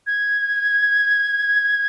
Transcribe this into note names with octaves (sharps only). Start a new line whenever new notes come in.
G#6